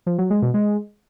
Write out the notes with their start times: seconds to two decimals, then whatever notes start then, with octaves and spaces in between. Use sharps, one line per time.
0.06 F3
0.18 F#3
0.30 G#3
0.42 B2
0.54 G#3